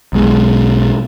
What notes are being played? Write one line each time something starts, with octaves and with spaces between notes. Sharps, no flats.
B1 B2 G#3